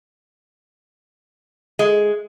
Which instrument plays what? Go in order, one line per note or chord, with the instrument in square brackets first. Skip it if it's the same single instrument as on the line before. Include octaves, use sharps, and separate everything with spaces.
[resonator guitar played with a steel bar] G#3